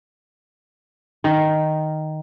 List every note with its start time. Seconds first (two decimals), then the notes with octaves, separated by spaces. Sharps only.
1.24 D#3